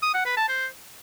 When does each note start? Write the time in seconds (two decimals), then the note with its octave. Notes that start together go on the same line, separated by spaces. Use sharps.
0.03 D#6
0.14 F#5
0.26 B4
0.37 A5
0.48 C5